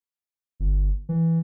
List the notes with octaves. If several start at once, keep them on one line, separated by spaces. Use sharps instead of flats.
G1
E3